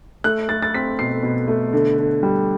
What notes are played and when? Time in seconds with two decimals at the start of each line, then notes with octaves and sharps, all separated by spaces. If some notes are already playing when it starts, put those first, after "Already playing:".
0.24 A3 F#6
0.49 A3 A6
0.62 A6
0.74 C4 B6
0.99 B2 C7
1.23 B2
1.48 A3
1.73 D3
1.98 D3
2.23 G3